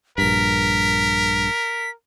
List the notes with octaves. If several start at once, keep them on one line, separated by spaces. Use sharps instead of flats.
A#1 G2 A#4 B6